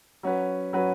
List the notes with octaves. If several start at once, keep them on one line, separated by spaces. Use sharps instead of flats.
F#3 C#4 F#4 B4
F#3 C#4 F#4 B4